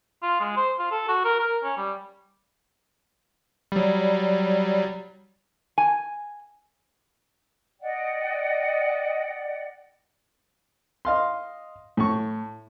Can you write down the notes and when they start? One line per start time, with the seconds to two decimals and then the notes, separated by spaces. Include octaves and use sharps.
0.23 F4
0.40 G#3
0.57 C5
0.79 F4
0.91 A4
1.08 F#4
1.25 A#4
1.39 A#4
1.63 C#4
1.77 G3
3.72 F#3 G3
5.78 G#5
7.81 D5 D#5 F#5 G5
11.05 D#5 F5 C6
11.97 A2 C#6